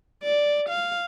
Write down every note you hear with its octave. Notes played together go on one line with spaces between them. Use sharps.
D5
F5